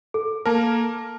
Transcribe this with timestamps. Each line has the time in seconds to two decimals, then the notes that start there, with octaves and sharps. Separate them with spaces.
0.14 A4
0.45 A#3 A#4 A5